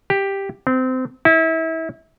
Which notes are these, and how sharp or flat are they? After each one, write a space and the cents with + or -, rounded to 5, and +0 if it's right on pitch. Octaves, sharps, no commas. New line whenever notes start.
G4 +5
C4 -25
E4 -30